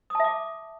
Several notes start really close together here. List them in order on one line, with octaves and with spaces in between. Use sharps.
D#6 A5 E5 D6